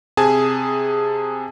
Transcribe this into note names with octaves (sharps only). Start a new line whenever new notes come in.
C3 G#4 G#5 A5